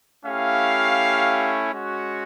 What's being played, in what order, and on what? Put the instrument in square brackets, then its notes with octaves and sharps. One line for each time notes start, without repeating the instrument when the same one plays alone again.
[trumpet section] A3 C#4 E4 G4 F5
G#3 C#4 F#4